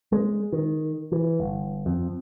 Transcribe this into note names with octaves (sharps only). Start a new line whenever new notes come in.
G#3
D#3
E3
G1
F2